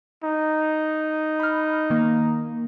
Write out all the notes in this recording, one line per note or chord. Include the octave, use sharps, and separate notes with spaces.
D#4
B5 F6
D#3 A#3